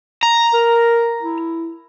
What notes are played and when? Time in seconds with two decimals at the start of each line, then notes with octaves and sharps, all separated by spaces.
0.23 A#5
0.53 A#4
1.23 E4